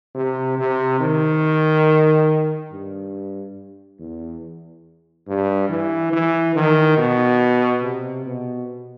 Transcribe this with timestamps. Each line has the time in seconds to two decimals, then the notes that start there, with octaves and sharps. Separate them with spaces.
0.15 C3
0.58 C3
1.00 D#3
2.71 G2
3.99 E2
5.27 G2
5.70 E3
6.12 E3
6.55 D#3
6.97 B2
7.82 C3
8.26 B2